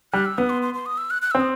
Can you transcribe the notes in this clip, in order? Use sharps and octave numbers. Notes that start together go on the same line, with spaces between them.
G3 F#6
E6
B3 D#6
C6
C6
C6
D#6
E6
F#6
F#6
E6
C4
D#6